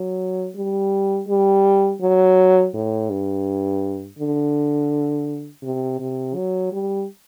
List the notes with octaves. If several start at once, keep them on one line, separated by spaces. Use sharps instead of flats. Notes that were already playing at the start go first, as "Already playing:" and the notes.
Already playing: F#3
G3
G3
F#3
A2
G2
D3
C3
C3
F#3
G3